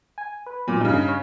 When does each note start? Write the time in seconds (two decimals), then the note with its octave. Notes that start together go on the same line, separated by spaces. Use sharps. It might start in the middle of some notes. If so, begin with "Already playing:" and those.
0.18 G#5
0.46 B4
0.68 A#2 F#3
0.81 G2 C#3 D#4
1.08 C#5